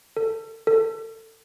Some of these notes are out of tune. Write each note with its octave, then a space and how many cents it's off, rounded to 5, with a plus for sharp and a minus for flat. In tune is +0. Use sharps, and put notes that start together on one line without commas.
A4 +25
A4 +25